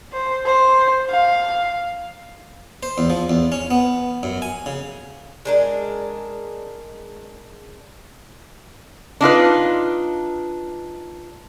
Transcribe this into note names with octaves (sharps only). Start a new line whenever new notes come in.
C5
C5
F5
C5
E2
F3
E2
C#4
B3
F#2
G#5
C#3
G#3 D4 A#4
D4 D#4 F4 B4